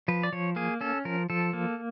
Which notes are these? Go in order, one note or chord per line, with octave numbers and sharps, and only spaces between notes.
F3 B4
D5
F3 C#5
A#3 G#4
C#4 A4
F3 A#4
F3 A4
A#3